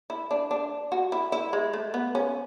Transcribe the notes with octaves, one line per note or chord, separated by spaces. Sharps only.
E4
D4
D4
F#4
E4
E4
G#3
A3
B3
C#4